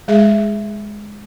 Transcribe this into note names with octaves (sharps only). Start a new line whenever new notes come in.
G#3 G#4 E5